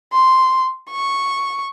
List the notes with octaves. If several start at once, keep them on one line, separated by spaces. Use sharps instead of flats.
C6
C#6